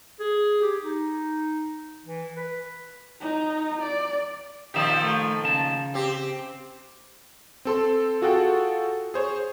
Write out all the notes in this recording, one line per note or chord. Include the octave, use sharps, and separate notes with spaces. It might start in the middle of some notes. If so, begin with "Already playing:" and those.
G#4
G4
D#4
E3
B4
D#4
D5
A#2 D#3 F3 G4 E5
A3
C#3 A5
C4 G4
C4 A4 C6
F4 F#4 G#4 A4 F#5 G5
G#4 C5 C#5